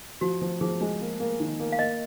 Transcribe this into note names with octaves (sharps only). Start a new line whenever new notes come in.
F3 F#4
F3
F3 G#4
G#3
A#3
A#3
D#3
A#3
F5
A#3 D#5